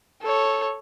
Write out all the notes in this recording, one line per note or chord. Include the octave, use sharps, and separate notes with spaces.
A4 C#5